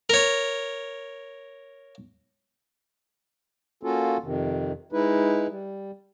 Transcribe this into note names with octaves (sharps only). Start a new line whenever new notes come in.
A#4 C#5
A#3 C#4 F4 F#4 A4
F2 C3 D#3
G#3 D#4 E4 B4
G3